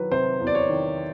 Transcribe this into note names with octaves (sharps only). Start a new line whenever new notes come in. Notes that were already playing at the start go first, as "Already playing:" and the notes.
Already playing: D#3 F#3 B4
C3 C5
E2
D5
C#5
D#3